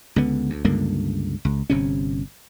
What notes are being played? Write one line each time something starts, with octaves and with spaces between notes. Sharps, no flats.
C#2 D3 B3
D2
C#2 G2 D3 A#3
C#2
G1 C3 C#4